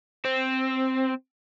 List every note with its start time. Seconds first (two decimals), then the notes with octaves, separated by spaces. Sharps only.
0.25 C4